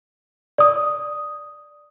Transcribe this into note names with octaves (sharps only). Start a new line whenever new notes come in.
D5 D#6